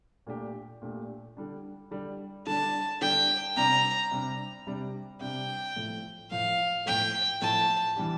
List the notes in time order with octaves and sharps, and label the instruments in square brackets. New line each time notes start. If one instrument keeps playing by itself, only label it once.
[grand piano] A#2 A3 D4 G4
A#2 A3 D4 G4
D3 G3 D4
D3 G3 D4
[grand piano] D3 G3 D4 [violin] A5
[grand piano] D3 G3 D4 [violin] G5
[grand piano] C3 G3 D4 [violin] A#5
[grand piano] C3 G3 D4
C3 G3 D4
[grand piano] C3 G3 D4 [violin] G5
[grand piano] A2 F3 A3
[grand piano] A2 F3 A3 [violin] F5
[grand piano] A2 F3 A3 [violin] G5
[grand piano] A2 F3 A3 [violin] A5
[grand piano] E3 G3 D4 G4